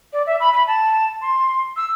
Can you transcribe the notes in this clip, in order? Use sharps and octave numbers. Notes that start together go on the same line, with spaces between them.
D5
E5
B5
B5
A5
C6
E6